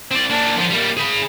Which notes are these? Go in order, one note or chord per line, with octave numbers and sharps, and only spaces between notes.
C4 D5
A#3 D4
D3 F3
G3 A#3
G#4 B5